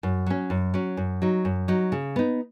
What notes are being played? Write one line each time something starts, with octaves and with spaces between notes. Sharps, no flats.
F#2
F#3 C#4
F#2
F#3 C#4
F#2
F#3 D#4
F#2
F#3 D#4
C#3
B3 D#4